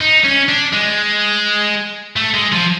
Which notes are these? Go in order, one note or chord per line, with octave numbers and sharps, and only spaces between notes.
D#4
C#4
D4
G#3
A3
G#3
F3